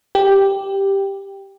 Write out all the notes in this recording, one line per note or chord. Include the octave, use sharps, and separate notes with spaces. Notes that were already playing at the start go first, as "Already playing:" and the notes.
G4